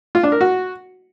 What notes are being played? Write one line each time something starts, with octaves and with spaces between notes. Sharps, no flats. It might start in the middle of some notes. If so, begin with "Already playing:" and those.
F4
D4
A#4
F#4